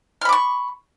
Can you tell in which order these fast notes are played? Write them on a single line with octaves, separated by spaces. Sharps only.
F6 B5 D6 C#6